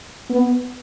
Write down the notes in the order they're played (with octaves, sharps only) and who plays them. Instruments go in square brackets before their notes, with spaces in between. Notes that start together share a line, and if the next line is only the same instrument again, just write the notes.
[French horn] B3